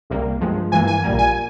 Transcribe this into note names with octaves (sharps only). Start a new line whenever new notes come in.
C2 C3 G3 A#3
G2 F3 G#3
G2 E3 A#3 G#5
G#5
A#1 A#2 G3 A#3
G#5